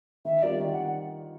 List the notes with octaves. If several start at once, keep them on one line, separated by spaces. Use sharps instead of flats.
D#3 E5
G3 C4 F4 A#4 D5
D#3
F#5